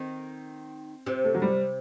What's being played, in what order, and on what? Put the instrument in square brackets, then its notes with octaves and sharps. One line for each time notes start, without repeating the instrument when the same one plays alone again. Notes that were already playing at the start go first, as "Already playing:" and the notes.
Already playing: [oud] D#3 [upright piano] C4
[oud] C3 [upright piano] C4
[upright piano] A3
F#3
G3